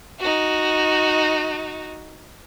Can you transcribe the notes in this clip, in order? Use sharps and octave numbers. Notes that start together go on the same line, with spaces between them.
D#4 F#4